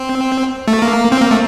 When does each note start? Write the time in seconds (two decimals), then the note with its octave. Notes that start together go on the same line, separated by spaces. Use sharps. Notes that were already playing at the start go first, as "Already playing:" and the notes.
Already playing: C4
0.68 A3
0.82 A#3
1.12 C4
1.21 A#3
1.31 A3